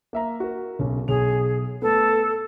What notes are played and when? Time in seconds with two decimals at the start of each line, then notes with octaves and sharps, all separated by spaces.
0.13 A#3 E5 A#5
0.40 F#4 A#4
0.79 B1 C#3 C#4
1.08 B1 G#4 F7
1.82 A3 B3 A4